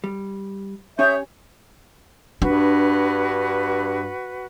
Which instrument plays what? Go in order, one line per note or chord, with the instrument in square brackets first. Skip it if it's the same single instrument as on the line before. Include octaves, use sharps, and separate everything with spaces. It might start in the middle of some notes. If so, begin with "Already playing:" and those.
[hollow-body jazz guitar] G3
[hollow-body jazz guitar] C#4 G4 G#5 [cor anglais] C#5 [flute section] E5 D#6 G6
[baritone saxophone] G2 [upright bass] D4 [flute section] F#4 B4